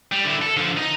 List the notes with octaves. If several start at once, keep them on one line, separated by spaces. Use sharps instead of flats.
G3
D3 E4
A4
D3 F3
D#4